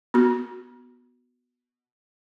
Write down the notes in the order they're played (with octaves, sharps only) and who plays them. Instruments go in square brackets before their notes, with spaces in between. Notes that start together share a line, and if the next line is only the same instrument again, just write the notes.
[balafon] B3 F#4